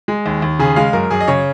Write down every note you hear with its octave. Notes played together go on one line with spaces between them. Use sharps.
G#3
D#2
D#2
C#3 G#4
G#3 F5
F#2 A#4
F#2 G#4
D#5
C#3 C#5